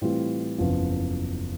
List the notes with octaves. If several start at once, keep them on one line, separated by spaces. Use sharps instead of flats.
A2 E3 G3 C4 F4
F#1 E2 C#3 F3